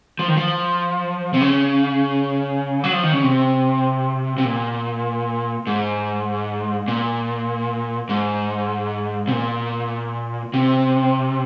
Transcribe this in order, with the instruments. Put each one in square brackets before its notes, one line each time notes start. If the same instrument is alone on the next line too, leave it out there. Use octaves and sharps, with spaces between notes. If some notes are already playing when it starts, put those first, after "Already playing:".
[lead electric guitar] F3
D#3
F3
C3
C#3
F#3
F3
D#3
C#3
C3
C3
A#2
G#2
A#2
G#2
C3
A#2
C3